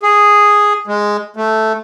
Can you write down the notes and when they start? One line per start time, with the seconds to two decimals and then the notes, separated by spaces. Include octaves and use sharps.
0.03 G#4
0.87 G#3
1.36 A3